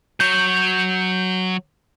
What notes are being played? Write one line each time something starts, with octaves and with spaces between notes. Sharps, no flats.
F#3 C#5 G6